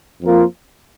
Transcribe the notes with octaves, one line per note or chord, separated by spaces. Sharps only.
F2 F3 A#3 F4 A#4